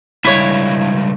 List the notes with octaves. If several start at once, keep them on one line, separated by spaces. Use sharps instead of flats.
C#2 G2 E4 C#5